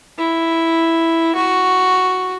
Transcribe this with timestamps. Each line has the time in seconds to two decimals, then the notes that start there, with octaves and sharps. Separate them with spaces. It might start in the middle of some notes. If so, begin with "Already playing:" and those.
0.18 E4
1.36 F#4